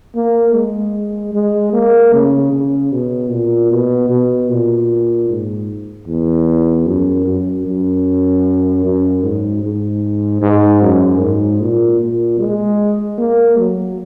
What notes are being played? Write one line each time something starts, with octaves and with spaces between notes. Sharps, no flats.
A#3
G#3
G#3
A#3
C#3
C#3
B2
A#2
B2
B2
A#2
G#2
E2
F#2
F#2
F#2
F#2
G#2
G#2
G#2
F#2
G#2
A#2
A#2
G#3
A#3
F#3